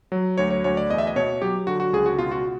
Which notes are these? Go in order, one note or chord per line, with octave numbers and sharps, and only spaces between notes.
F#3
D2 C#5
C#5
D2 C#5
D5
E2 D#5
E5
D#5
B2 C#5
F#3 G4
D3 F#4
F#4
C#2 G#4
F#4
B2 F4
F#4